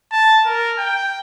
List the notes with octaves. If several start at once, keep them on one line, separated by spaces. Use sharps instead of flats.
A5
A#4
G5